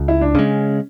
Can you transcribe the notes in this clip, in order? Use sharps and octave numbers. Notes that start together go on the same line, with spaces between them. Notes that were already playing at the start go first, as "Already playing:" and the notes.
Already playing: C#2
E4
D4
C#3 G#3 C#4